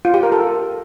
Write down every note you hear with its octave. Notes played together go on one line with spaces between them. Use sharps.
F4
G4
A#4
A4